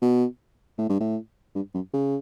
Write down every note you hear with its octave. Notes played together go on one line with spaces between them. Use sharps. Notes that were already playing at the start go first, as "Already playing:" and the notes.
B2
A2
G2
A2
G2
F#2
C#3